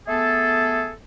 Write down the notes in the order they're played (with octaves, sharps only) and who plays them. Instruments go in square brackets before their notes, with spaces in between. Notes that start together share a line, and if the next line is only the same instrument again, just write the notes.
[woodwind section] A3 B3 G#4 A4